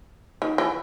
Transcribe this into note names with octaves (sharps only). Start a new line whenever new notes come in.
D#3
E3